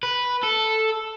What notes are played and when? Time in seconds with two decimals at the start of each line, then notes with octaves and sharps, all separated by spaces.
0.03 B4
0.43 A4